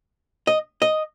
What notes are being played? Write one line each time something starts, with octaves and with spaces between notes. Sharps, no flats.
D#5
D#5